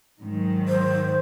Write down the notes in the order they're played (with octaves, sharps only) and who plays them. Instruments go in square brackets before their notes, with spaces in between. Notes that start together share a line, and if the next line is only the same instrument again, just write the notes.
[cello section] G#2 D#3 F#3
[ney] C5